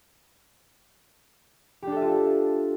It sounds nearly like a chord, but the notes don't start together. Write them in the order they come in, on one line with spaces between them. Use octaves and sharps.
G4 D4 A4 E5 F4